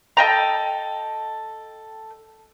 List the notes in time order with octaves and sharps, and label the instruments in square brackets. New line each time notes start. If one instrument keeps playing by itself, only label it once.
[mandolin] A4 D#5 G5 A#5